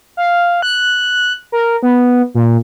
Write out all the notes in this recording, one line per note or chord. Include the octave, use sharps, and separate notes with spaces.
F5
F#6
A#4
B3
A#2